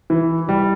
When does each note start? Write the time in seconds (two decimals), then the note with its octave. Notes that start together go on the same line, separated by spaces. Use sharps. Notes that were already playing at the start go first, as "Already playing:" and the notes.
0.10 E3
0.49 G3